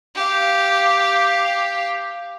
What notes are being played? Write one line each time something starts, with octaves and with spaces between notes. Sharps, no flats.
G4 F5